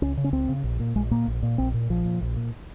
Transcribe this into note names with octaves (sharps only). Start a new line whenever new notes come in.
C#2 C#4
C#3
C#4
C#2 C4
C#3
A#1
A#2
A#1 G#3
A#2 A#3
A#1
A#2
A#1 C4
A#2
A#1 F3
A#2
A#1
A#2